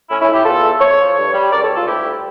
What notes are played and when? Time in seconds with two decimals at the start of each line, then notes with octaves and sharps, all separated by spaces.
0.09 A2 C#4 E4
0.21 C#4 E4
0.27 A2
0.33 E4 G4
0.45 E2 F4 A4
0.63 A3
0.80 F2 A4 C#5
0.99 F3
1.16 G2
1.34 G3
1.52 C#2 A#4 D5
1.63 A4 C#5
1.69 G3
1.75 F4 A4
1.86 D2 E4 G4
2.04 G3